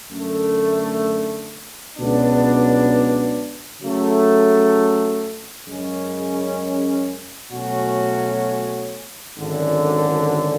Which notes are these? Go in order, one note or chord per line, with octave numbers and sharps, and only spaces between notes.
F#2 D3 A3
C#2 B2 F#3 B3 D4
C#3 F#3 A3
F#2 C#3 G#3 C#4
B2 F#3 A3 C#4 F#4
G#1 F#2 D3